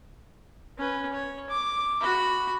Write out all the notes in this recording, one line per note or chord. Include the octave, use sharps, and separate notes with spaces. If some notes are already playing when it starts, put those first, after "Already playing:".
C#4 B4
C#5
D6
F#4 B5